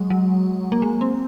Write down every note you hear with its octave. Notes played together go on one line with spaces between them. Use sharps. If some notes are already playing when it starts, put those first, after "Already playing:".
Already playing: F#3 G#3
F#3
A#3
G#3
C4